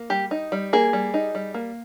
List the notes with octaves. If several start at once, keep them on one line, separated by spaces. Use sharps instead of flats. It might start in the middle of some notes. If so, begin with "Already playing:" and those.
Already playing: A#3
G3 G4
D#4
G3
A#3 G#4
G3
D#4
G3
A#3